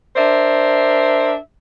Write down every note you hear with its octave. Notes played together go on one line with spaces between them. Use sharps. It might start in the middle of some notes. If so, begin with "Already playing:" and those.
D4 A#4 C5 D5 E5